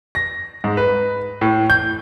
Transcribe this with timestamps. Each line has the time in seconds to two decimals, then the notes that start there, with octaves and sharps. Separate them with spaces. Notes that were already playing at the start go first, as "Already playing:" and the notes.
0.15 A#6
0.64 G#2
0.77 B4
1.41 A2
1.70 G6